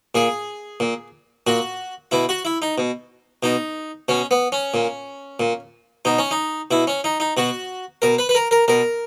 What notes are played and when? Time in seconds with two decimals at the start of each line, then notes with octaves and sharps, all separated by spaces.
0.15 A#2 G#4
0.80 A#2
1.47 A#2 F#4
2.11 B2 E4
2.29 F#4
2.45 E4
2.62 D#4
2.78 B2
3.43 B2 D#4
4.08 B2 C#4
4.31 B3
4.52 C#4
4.74 A#2
5.40 A#2
6.05 B2 D#4
6.19 C#4
6.31 D#4
6.71 B2 E4
6.87 C#4
7.04 D#4
7.20 D#4
7.37 B2 F#4
8.02 B2 A#4
8.19 B4
8.29 B4
8.35 A#4
8.51 A#4
8.68 B2 A#4